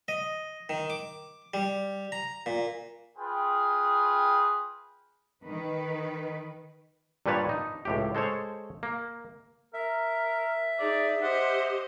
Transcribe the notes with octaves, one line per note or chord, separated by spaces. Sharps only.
D#5
D#3
D6
G3
A#5
A#2
F4 G#4 B4 G5
D#3 B4
G2 A#2 G3 B4 C#5 A5
D#4
C#2 A2 G4
G#3 A4 C5 C#5
A#3
A#4 E5
D#4 G#4 D5
G4 C5 D#5 F#5